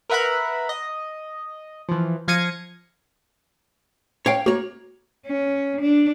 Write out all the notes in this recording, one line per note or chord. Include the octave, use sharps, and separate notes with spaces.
A#4 B4 E5 F#5 A#5 B5
D#5
E3 F3
F3 F5 G#6 A#6 C#7 D#7
C#5 F5 G5
A#3 F#4 C#5
C#4
D4